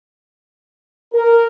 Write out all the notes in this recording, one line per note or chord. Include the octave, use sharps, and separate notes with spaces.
A#4